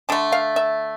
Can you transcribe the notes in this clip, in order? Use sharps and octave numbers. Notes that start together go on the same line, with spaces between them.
D3 A3 A5
F5
E5